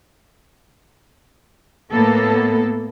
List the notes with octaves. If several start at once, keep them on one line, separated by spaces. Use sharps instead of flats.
A2 A#3 B3 A4